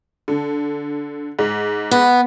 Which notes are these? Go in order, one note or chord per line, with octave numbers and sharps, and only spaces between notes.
D3
G#2
B3